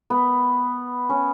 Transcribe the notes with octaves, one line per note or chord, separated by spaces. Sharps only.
B3
C#4